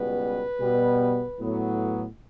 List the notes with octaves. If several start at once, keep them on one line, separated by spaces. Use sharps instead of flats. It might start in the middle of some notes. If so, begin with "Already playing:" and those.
Already playing: C#2 B2 G3 B3 B4
B2 G3 B3
A2 F#3 B3